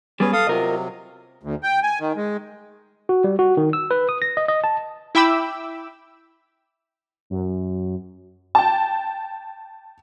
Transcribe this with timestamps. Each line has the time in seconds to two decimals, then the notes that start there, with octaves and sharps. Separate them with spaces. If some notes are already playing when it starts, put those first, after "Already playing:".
0.20 G3 B3 C#4 G#4 B4
0.33 A4 F5 D#6
0.47 C3 F#3 F4 A#4 D#5
1.43 D2
1.63 G5
1.83 G#5
2.00 D#3
2.16 G#3
3.09 F#4
3.24 G3
3.39 F#4
3.57 D#3
3.73 E6
3.91 B4
4.09 D#6
4.22 A#6
4.37 D#5
4.48 D#5
4.64 A5
5.15 E4 E5 G5 B5 D6 E6
7.30 F#2
8.55 G5 A5